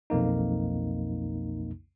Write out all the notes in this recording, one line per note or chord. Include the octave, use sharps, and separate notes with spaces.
B1 F2 A#3 D#4